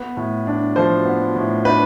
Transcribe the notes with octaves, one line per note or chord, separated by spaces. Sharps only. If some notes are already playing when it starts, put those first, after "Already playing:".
Already playing: B3
A2
D4
F3 C5
B3
A2
D4 B4